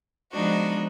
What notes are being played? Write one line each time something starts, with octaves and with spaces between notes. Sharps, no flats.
F3 G#3 B3 D4 D#4 F#4